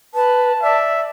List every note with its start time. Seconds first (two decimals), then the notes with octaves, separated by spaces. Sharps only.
0.14 B4 A5
0.62 D5 E5